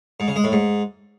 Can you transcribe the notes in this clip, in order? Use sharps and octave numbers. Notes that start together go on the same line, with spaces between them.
G#2
C#3
G#3
A2
G#2